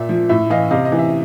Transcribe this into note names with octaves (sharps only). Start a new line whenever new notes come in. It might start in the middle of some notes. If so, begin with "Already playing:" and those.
Already playing: A#2 E5
F3
A2 E5
E3 D#5 F5
C3 D#5 F5
D#5
E3
E5